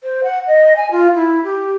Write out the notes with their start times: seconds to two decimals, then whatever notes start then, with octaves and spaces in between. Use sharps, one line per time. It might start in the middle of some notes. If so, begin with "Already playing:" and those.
0.04 C5
0.24 F#5
0.47 D#5
0.76 G#5
0.91 F4
1.15 E4
1.44 G4